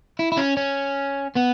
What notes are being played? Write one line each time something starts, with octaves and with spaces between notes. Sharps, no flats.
E4
E4
C#4
C#4
B3